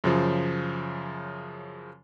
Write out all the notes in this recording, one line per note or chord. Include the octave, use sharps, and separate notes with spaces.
F#2 C#3 F3